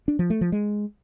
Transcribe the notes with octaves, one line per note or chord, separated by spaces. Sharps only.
D4
F3
A3
F3
G#3